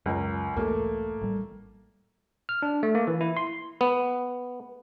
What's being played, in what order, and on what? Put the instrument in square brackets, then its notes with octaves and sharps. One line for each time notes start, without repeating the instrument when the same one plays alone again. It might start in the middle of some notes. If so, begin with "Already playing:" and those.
[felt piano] C#2 A#4 [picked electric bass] F#2
[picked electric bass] B1 E2 G#2 [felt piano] A3 A#3
[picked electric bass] A1 G3
[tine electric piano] F6
D4
A3
A#3
E3
E4
C6
[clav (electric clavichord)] B3